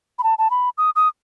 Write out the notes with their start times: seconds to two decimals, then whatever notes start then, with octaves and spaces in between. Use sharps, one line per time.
0.19 B5
0.23 A5
0.38 A5
0.50 B5
0.78 D#6
0.96 D#6